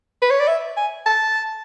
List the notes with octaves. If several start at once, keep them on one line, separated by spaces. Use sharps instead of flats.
B4
C#5
D5
E5
G#5
A5